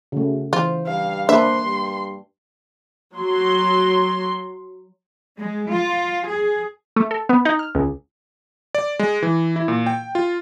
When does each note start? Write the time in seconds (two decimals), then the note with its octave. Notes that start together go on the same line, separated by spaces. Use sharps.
0.12 C#3 A3 F#4
0.53 E3 F4 C5
0.86 G2 F5
1.29 A#3 D4 B4 C5 E5 C6
1.64 G2
3.15 F#3 C6
5.38 G#3
5.73 F4
6.27 G#4
6.96 A3
7.11 A4
7.29 B3
7.45 D#4
7.59 F6
7.75 C#2
8.75 D5
8.99 G#3
9.22 E3
9.56 E4
9.68 A#2
9.86 G5
10.15 F4